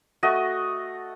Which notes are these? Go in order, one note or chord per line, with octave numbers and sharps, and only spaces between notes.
A3 F#4 D#5